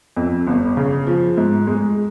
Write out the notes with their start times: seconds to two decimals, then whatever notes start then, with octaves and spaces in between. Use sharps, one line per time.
0.17 F2
0.47 G1
0.77 C#3
1.07 F3
1.37 G#2
1.67 G#3